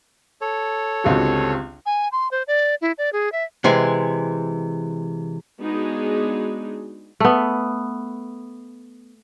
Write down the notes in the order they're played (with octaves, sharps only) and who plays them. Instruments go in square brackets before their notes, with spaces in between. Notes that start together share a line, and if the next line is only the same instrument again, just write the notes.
[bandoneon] A4 C#5
[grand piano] G1 C#2 F#4 [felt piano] C4 G4
[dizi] G#5
C6
C5
D5
E4
D5
G#4
E5
[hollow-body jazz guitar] C3 E3 G#3
[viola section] G#3 B3 D4 D#4 F#4 G#4
[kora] A3 B3